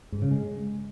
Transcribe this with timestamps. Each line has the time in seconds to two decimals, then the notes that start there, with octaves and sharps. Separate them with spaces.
0.12 G#2
0.22 C#3
0.31 G#3